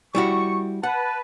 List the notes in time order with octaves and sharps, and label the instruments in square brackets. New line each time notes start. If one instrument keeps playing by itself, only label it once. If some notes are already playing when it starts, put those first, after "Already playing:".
[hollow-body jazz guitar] G3 E4 F#4 [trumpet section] C#6
[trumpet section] B4 A5 [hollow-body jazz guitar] F#5